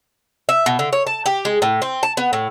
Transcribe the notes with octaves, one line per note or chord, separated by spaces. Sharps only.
E5
B2
D3
C#5
A5
G4
G#3
A2
C4
A5
B3
A2